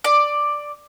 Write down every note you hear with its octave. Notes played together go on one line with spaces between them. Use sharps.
D5